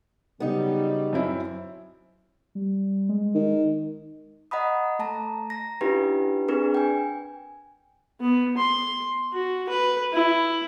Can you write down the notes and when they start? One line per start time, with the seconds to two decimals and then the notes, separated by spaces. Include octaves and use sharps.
0.40 C#3 F#3 G3 B3 D#4
1.13 F#2 C4 E4
2.55 G3
3.09 G#3
3.35 D#3
4.51 D#5 F#5 A#5 B5 D#6
4.99 A3 A5 A#5
5.50 A#5 A#6
5.81 C#4 D4 E4 F4 G4 B4
6.48 C4 D4 G#4 A#4 B4
6.74 G5 G#5
8.21 B3
8.57 C6
9.33 F#4
9.69 B4
10.13 E4